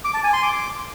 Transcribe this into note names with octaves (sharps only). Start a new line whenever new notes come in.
D6
A5
G#5
C6
D6